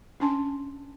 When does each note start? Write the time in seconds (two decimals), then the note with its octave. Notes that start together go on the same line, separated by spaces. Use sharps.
0.20 C#4 D4 G#5 A5 C6